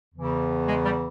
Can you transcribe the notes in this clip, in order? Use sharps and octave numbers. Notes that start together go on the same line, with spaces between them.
E2 C#3 E3
G#3
G3